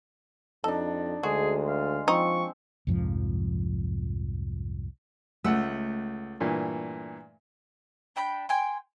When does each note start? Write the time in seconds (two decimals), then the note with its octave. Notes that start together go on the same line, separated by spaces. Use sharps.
0.64 F2 D4 D#4 A4
1.23 D2 G#3 F#4 G#4
1.67 F5
2.08 F3 C4 D#4 C#6
2.87 C2 F2 G#2 F3
5.44 C#2 A3 F#5 E6
6.40 G2 A#2 E3
8.16 D4 G5 B5 G6
8.49 G5 G#5 C6